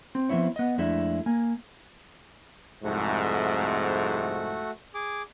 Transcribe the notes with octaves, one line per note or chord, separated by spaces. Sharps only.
C4
F3 B3 C4 E4 C#5
B3 D#5
F2 G#3 A3 D4 E4
A#3 G#5
C2 F2 G#2 A3 F#4
G#4 D6